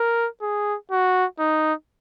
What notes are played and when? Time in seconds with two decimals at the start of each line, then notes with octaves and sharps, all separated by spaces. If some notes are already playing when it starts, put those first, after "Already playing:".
Already playing: A#4
0.41 G#4
0.91 F#4
1.39 D#4